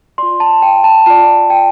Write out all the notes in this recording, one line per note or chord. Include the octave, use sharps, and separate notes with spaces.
F4 D5 C6
A5
G5
A5
F4 D5 A5
G5